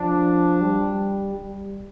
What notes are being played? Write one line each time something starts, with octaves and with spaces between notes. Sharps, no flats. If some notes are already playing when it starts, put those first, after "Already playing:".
Already playing: F3 D4
G3
G3